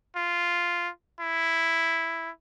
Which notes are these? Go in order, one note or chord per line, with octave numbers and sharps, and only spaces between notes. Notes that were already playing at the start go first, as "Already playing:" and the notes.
F4
E4